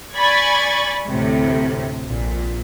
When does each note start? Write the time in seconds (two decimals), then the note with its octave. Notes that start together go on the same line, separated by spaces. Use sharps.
0.17 D5 G#5 B5 C#6 G#6 A6
1.07 D2 A2 C3
2.06 A#1 A#2